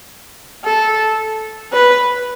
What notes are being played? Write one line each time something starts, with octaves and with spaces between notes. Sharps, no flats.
A4
B4